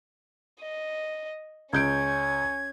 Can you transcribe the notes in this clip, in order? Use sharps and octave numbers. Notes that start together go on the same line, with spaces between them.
D#5
C#2 C#4 G6 G#6 D7